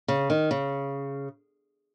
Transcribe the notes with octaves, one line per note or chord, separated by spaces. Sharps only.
C#3
D#3
C#3